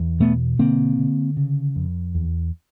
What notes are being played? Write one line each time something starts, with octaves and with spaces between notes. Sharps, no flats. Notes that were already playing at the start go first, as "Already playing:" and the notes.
Already playing: E2
B2 A3 B3
D3 A#3 C4
D3
C#3
F2
E2